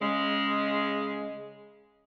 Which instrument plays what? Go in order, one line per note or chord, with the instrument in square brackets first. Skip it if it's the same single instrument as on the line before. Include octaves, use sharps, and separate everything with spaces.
[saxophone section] C#3 G#3